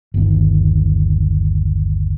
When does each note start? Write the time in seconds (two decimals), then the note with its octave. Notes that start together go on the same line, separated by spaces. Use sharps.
0.14 G1 D#2